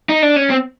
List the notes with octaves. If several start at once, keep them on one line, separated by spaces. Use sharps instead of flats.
D#4
D4
C#4
C4